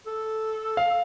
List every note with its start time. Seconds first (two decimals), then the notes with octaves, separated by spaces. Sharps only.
0.07 A4
0.77 F5